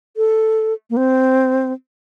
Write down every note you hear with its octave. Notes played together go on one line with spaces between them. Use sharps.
A4
A#3
C4